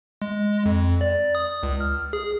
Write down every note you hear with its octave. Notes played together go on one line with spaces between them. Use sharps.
G#3
F2
D5
D#6
C#2
F6
G#4